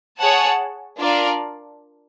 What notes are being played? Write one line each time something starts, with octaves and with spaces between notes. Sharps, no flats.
G#4 C#5 F#5 A5
D4 F4 A#4 D5 F5